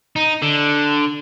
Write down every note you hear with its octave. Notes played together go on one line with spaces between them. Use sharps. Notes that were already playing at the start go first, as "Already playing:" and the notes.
D#4
D3